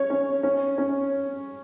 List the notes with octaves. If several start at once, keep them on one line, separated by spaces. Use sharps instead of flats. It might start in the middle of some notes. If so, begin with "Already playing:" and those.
Already playing: C#4 C#5
C#4
C#4
C#4